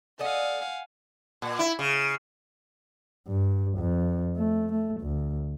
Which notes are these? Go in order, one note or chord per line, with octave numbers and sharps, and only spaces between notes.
A4 D5 D#5 F5 F#5 G#5
A#2
E4
C#3
G2
F2
A3
A3
D2